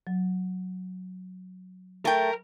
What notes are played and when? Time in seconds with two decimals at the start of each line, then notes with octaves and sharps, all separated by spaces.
0.07 F#3
2.05 A3 A#4 G5